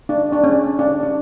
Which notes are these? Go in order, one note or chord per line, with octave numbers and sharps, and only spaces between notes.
D4
D4
C#4
D4
D4